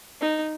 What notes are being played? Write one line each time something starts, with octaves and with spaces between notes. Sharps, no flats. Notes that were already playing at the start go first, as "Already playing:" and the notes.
D#4